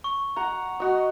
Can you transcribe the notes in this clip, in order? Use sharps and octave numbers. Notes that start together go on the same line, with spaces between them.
C#6
F#5 A#5
F#4 D#5